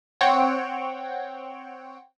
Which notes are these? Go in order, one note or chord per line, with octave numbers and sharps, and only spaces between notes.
C4 C#5 F#5 G5